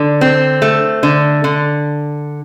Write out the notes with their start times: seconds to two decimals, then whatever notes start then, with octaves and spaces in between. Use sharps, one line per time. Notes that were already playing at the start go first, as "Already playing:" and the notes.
Already playing: D3
0.21 C4
0.62 A3
1.03 D3
1.44 D3